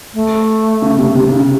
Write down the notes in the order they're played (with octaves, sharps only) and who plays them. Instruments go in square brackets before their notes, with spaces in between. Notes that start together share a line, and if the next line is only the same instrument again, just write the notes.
[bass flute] A3
[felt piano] C#3
C3
C3
C#3